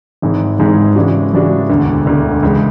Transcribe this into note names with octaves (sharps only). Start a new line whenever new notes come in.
G#1 G#2 E3 G#3
G#1 G#2 E3 G#3
C#3 E3 G#3 D4 F#4
C#3 E3 G#3 D4 F#4
E1 D2 D3
E1 D2 D3
C#2 C#3 E3 G#3